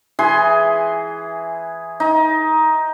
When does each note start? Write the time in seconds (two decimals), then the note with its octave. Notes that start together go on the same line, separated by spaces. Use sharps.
0.19 E3 G#4 C6
2.00 D#4